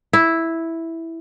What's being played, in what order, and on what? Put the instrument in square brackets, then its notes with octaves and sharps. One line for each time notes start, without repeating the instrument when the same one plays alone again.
[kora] E4